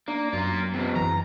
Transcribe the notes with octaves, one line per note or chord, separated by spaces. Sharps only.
A#3 D4
F#2 F#3 A#3 F4
E2 B2 C4
E3 A#5